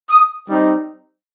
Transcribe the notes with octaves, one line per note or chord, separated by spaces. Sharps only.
D#6
G3 C4 D#4